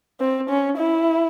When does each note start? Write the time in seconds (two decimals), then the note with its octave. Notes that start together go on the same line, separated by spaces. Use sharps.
0.20 C4
0.49 C#4
0.77 E4